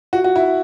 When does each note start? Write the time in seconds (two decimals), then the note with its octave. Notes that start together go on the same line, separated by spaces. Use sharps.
0.13 F#4
0.24 F#4
0.36 E4